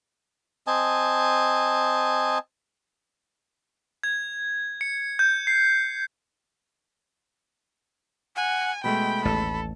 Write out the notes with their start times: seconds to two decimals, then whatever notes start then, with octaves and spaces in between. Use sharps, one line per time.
0.67 C4 D#5 G#5 A5
4.03 G#6
4.81 C#7
5.19 G6
5.47 C7
8.36 F#5 G#5
8.84 B2 G#3 A3 G5 B5
9.25 A1 D#2 A4